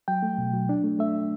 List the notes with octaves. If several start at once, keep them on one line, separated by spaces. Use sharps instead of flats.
F#3 G5
A3
B2
F#3
D4
A3
A3 E5